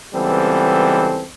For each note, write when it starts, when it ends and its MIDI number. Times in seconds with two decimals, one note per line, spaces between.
0.14 1.25 37
0.14 1.25 52
0.14 1.25 55
0.14 1.25 59
0.14 1.25 60
0.14 1.25 69